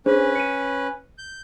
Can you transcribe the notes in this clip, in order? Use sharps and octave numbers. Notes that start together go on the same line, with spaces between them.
C#4 D4 G#4 B4 C5
C#7 D#7
G6